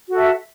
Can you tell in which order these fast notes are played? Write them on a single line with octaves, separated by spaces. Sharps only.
F#4 A4 E5